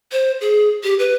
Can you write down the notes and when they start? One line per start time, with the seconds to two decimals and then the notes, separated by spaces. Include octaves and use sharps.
0.12 C5
0.41 G#4
0.84 G4
0.99 B4